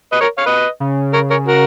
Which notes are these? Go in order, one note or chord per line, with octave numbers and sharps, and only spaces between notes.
B4 D#5
A#4 C#5
C#5 F5
B4 D#5
C#3
A#4 C#5
A#4 C#5
F#4 A#4